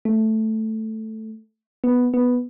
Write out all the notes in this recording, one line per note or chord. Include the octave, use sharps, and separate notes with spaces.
A3
B3
B3